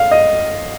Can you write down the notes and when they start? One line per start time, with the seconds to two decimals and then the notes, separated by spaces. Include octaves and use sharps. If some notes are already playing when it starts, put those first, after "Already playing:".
Already playing: F5
0.11 D#5